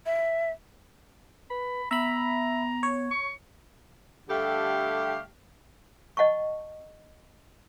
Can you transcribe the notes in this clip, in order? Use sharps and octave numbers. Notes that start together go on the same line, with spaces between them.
E5
B4 B5
B3 E5 A#5 B5
C#5
C#6
D3 G3 A3 G4 A4 F5
D#5 F#5 A5 C#6